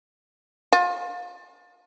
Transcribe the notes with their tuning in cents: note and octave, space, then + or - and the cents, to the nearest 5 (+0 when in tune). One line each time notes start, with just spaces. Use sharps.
F4 +30